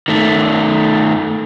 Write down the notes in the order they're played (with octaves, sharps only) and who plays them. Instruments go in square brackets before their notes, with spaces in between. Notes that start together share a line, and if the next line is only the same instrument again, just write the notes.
[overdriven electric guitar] D#3 A3